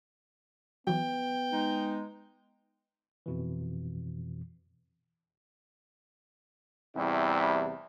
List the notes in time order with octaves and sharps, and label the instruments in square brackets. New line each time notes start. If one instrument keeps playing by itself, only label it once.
[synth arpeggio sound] E3 F#3 [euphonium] B3 [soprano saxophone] G5
[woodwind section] G#3 D#4
[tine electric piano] F2 B2 E3
[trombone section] E2 C3 G3 E4